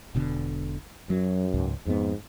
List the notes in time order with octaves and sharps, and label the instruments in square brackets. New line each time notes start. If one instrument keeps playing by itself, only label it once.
[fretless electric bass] E1 B2 D3
[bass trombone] F#2 [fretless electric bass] F#3
[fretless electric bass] C#2 G#2
[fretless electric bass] F2 B3 [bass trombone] G#2